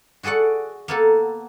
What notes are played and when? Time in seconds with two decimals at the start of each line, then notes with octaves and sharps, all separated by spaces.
0.23 F#4 G#4 A4 D5 F#5
0.88 A#3 B3 A4